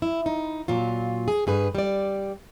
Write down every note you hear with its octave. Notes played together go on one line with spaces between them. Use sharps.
E4
D#4
A#2 F#3 F4
G#4
G2 G#4 B4
G3 D5